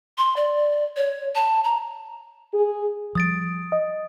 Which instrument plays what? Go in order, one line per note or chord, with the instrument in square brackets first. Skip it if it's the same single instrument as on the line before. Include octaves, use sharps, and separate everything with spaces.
[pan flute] C6
D5
C#5
A5
A#5
[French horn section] G#4
[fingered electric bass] F3 G3 [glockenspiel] D#6 A6 D7
[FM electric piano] D#5